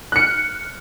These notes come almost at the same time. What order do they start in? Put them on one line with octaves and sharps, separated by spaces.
F#6 C#7 F6